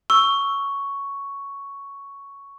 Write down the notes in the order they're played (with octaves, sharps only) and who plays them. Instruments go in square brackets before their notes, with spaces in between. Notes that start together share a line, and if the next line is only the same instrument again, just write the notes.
[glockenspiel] C#6 [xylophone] E6